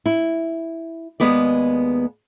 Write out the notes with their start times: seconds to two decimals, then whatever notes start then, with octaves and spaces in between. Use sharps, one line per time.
0.06 E4
1.20 D#2 G#3 B3 B4 D5